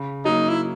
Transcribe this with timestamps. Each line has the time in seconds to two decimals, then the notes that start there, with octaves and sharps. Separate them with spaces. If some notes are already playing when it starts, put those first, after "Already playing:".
Already playing: C#3
0.25 F#3 A#3 D#4
0.49 E4